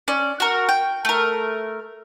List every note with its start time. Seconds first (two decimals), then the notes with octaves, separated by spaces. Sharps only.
0.08 C#4 D5
0.40 F#4 A#4
0.69 G5
1.05 A3 A#4